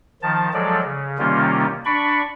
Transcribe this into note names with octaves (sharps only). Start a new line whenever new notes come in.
D#3 F3 A5
F3 F#3 G#3 A4 D5
C#3
C3 D#3 G3 A#3 C#4 F4
D4 D5 B5 C#6